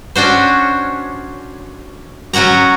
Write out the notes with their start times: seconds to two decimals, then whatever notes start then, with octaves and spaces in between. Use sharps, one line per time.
0.15 C#4 D4 F#4 C5
2.33 F#3 C#4 F#4 F#5 A#5